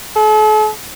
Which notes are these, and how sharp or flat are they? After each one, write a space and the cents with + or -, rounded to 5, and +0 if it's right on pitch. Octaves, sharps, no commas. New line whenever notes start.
A4 -45